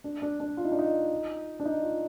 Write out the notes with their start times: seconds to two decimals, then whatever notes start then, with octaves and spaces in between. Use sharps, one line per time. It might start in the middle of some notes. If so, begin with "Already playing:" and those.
0.04 D4
0.22 D4
0.40 D4
0.57 F4
0.65 D#4
0.72 D4
0.79 D#4
1.60 D4
1.65 D#4
1.83 F4